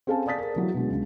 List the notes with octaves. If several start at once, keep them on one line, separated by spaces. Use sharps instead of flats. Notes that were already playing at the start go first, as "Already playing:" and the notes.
C4 C#4 A4 F5 G#5 A5
D5 F5 D#6 A6 B6
G#4 A#4
E3 F#3
B2 D3 G#3
C#2 G#3